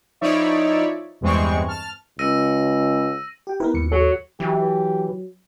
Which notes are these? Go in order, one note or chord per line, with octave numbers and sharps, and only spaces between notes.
F3 D#4 E4 C#5 D5 E5
E2 G2 E3 G#3 C4 C#6
A5 F6
C#2 E6 A#6 D#7
G4 G5
B3 E4 A#4 B4
D#2 G#2 C#7
F#3 A4
E3 F#3 G4